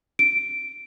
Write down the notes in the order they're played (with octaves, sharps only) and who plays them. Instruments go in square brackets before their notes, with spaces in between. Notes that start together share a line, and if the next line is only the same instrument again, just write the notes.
[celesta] D7